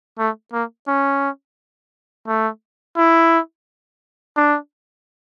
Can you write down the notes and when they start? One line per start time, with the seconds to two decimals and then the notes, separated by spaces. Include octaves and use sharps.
0.19 A3
0.53 A#3
0.88 C#4
2.28 A3
2.97 E4
4.37 D4